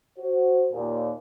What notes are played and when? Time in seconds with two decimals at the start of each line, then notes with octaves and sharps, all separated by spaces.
0.18 F#4 C5
0.72 D#2 A#2